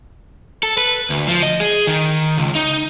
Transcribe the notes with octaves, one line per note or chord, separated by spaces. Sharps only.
A4
B4
D2
F3
D#5
G#4
D#3
C#2
D#4